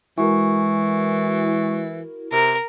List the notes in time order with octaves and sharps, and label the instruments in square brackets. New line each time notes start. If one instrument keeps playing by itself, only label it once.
[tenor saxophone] E3 [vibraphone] G#3 C#6 [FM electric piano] E4 F#4 A#4
[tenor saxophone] C3 [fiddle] A#4